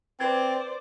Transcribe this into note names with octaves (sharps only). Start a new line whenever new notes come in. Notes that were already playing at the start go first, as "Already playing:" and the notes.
C4 B4 C5 D5 G#6 A6